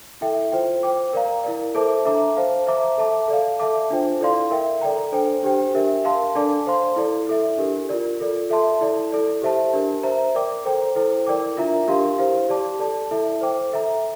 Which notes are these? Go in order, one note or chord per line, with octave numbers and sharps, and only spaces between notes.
E4 A4 E5 G5
F4 C5 G5
C5 G5 D6
A#4 D5 F5 A#5
E4 A#4 D5
A4 C5 E5 A5 D6
D4 A4 E5 A#5 D6
C5 F5 A5
C5 E5 A#5 D6
A4 E5 A5 D6
A4 D5 F5
A4 E5 A5 D6
D4 F4 C5 G5
E4 A4 D5 F5 C6
A#4 E5 G5
A4 D5 G5 A#5
D4 A4 C5 G5
D4 G4 C5 G5
D4 G4 A#4 E5
A#4 F5 A5 C6
D4 A4 D5 A5 D6
C5 F5 C6
E4 A4 D5
E4 A4 E5
D4 G4 A#4
F4 A#4 D5
F4 A4 D5
A4 E5 A5 C6
E4 A4 D5
E4 A4 D5
G4 C5 E5 A5
D4 G4 A#4
C5 E5 A#5
A#4 D5 G5 D6
A4 C5 G5 A#5
E4 A4 C5
E4 A#4 D5 G5 D6
D4 F4 A#4 E5 A#5
D4 G4 A#4 F5 C6
E4 G4 C5 F5
G4 D5 A5 D6
A4 D5 A5
E4 A4 E5
C5 G5 D6
A4 E5 A#5